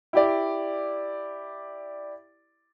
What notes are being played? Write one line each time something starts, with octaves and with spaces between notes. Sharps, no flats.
E4 G4 D5